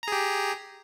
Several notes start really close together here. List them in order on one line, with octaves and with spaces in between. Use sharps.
A#5 G#4 G4